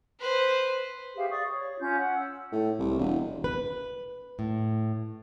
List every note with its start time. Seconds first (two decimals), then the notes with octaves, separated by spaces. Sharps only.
0.20 B4 C5
1.16 G4 G#4 E5 F5
1.31 D5 F5 C#6 D#6
1.50 C#5
1.80 C#4 F4 G6
1.97 F#5
2.15 E6
2.52 A2
2.79 C2
2.98 E1
3.44 B4
4.39 A2